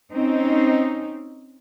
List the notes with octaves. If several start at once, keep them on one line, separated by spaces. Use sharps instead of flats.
C4 C#4 D#4